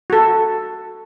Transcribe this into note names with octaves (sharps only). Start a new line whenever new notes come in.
F#4 A4